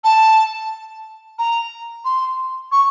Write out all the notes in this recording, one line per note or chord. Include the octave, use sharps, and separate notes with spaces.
A5
A#5
C6
C#6